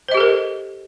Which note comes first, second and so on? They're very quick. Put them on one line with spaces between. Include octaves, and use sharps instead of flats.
C5 D#5 G4 A4 A#4